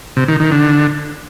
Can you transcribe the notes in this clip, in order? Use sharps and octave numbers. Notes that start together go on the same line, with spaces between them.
C3
D#3
D#3
D3